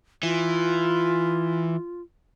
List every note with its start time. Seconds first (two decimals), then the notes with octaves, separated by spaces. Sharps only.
0.23 E3 F4